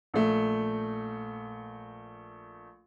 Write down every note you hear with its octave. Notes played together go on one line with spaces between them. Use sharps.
A#1 A3